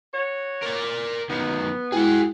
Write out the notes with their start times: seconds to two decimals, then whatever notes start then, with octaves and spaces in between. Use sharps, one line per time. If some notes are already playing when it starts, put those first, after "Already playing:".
0.14 F#4 C#5
0.63 A#4 D5
1.29 D#3 F#3 B3
1.92 G#3 E4 F#4 G#4 F#5 G5